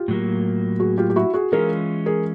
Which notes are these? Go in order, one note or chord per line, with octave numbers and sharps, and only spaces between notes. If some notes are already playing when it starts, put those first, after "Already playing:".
Already playing: F4 G4
A2 F#3 A#3
F#4 G#4
F4 G4
G4
E4 F#4
F#4 G#4
E3 G#3 C#4 F4 G#4 A#4
G#4 A#4